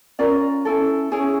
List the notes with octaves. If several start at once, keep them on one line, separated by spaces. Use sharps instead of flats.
C#4 F4 A#4 D5
C#4 E4 A4
C#4 E4 G#4 C#5